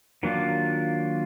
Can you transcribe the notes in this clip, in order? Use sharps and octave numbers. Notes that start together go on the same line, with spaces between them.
D#3 F#3 A#3 D4 F4